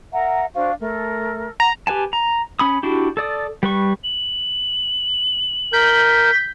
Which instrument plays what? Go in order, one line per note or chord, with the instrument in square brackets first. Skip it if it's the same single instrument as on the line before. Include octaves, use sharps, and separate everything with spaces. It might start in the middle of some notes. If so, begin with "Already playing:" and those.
[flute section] A#4 E5 A#5 [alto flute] F#5
[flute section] D4 F#4 C5 [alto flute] F5
[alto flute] A3 [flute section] A4 A#4
[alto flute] F#5 [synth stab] A#5
[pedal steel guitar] G4 B4 G#5 A5
A#5
C#4 B5 D#6
D4 E4 F#4 G4
A4 D5 D#6
G3 B4 C#6
[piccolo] F#7
[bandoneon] A#4 [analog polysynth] G6 B6